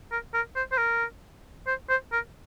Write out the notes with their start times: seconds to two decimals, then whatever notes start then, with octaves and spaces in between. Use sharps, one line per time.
0.11 A#4
0.34 A#4
0.56 C5
0.72 C5
0.78 A#4
1.67 C5
1.89 C5
2.12 A#4